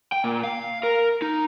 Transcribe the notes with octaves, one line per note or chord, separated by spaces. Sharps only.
G5
A#2
F5
A#4
D#4